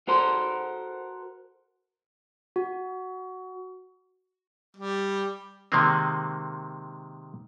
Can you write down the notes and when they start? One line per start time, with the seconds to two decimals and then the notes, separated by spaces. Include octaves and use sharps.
0.08 F#4 A4 A#4 C5
2.56 F#4
4.77 G3
5.72 C3 D#3 G#3 A#3 C4